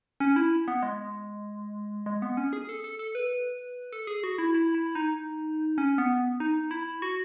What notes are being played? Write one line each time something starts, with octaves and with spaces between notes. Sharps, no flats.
C#4
E4
B3
G#3
G#3
B3
C#4
G#4
A4
A4
A4
B4
A4
G#4
F#4
E4
E4
E4
D#4
C#4
B3
D#4
E4
F#4